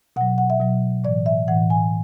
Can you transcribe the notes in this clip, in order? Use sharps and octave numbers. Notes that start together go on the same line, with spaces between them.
B2 F#3 F#5
F#5
E5
B2 F#3
A2 E3 D5
E5
A2 E3 F#5
G#5